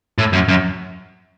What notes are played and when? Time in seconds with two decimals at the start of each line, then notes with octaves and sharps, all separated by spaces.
0.18 A2
0.33 F#2
0.48 F#2